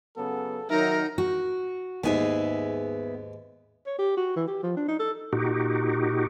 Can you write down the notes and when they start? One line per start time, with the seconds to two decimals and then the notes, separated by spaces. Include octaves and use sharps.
0.17 C#3 F#3 B3 A4
0.70 D#3 F#3 D#4 A#4 E5
1.18 F#4
2.04 D#2 G#2 B3 G#4 E5
3.86 C#5
3.99 G4
4.17 F#4
4.36 E3
4.48 G4
4.63 F3
4.77 D4
4.88 D#4
4.99 A4
5.33 A#2 D#4 F#4 G4